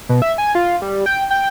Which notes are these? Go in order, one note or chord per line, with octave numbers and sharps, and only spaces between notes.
B2
E5
G#5
F4
G3
G5
G5